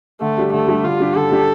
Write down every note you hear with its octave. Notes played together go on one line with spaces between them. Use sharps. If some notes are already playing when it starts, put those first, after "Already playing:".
D3 A3
G3 D4 G4
D3 A3
G3 D4 G4
D3 F4
G3 D4 G4
D3 A4
G3 D4 G4